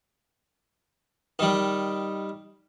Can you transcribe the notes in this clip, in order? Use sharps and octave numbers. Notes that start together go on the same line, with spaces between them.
D#3 G3